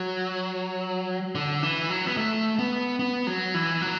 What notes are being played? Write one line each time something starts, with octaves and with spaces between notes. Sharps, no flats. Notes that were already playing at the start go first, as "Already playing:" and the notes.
Already playing: F#3
D3
E3
F#3
B3
A3
B3
B3
F#3
E3
F#3